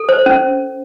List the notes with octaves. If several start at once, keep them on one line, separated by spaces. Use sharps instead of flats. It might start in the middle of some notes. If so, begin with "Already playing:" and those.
Already playing: A4
C5
C#4